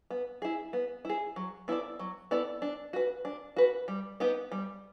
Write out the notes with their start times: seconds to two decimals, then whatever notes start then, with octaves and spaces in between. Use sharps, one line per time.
0.11 B3
0.42 E4 G#4
0.73 B3
1.05 E4 G#4
1.36 F#3
1.68 B3 E4 A4 D5
1.99 F#3
2.31 B3 E4 A4 D5
2.62 D4
2.93 F#4 B4
3.25 D4
3.56 F#4 B4
3.88 G3
4.20 B3 D#4 G4
4.52 G3